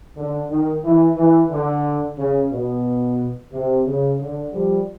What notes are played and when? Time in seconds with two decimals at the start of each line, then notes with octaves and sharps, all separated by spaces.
0.16 D3
0.50 D#3
0.83 E3
1.17 E3
1.51 D3
2.17 C#3
2.51 B2
3.52 C3
3.86 C#3
4.20 D3
4.53 F3 G3